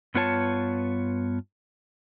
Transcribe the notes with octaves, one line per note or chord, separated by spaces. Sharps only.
G2 B3 F4 C#5 A5